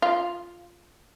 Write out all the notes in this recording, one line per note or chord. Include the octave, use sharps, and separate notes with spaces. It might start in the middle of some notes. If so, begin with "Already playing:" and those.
F4